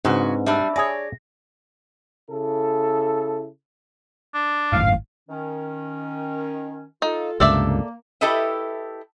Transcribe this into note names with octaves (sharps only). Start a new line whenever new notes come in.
G#2 C#3 C4 D4 F#4 B4
G3 D4 E5 B5 E6
G#4 C#5 D5 G#5 A#6
C#3 E4 A4
D4
G#1 F#2 A2 F5
D#3 C#4
D#4 F4 A4
C#2 G2 C3 A#3 A4 D5 E5
E4 G4 A4 B4 D#5 E5